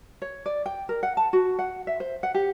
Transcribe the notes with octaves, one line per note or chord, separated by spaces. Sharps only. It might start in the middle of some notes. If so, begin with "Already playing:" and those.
C#5
D5
G5
A#4
F#5
A5
F#4
F#5
E5
C5
F#5
G4